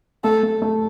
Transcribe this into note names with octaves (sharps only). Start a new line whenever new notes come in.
A3 A4
A3
A3